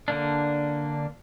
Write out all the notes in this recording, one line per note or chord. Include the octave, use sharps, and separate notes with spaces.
D3 A#3 D4